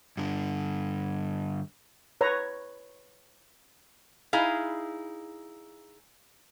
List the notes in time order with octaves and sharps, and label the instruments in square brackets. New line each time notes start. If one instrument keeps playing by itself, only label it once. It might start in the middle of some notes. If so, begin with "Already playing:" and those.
[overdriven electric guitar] G2 D3
[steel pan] B4 C#5 A#5
[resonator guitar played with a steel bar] D#4 E4 G#4 F5